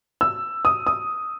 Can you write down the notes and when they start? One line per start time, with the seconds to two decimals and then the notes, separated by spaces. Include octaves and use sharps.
0.21 E6
0.65 D#6
0.87 D#6